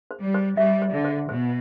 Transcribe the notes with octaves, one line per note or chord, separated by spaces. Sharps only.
C5
G3
C5
G3 E5
C5
D3
C5
B2 C5